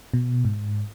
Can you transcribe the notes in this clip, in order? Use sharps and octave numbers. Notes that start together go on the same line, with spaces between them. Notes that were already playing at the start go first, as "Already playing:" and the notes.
B2
G#2